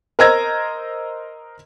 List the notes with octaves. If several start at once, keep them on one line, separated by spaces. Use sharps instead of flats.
A#4 C5 D#5 A#5 E6 G#6